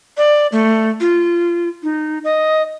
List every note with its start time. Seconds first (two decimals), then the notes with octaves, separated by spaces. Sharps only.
0.17 D5
0.52 A3
1.01 F4
1.83 D#4
2.24 D#5